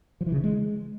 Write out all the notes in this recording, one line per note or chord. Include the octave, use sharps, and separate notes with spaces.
F3
E3
C#3
D#3
G#3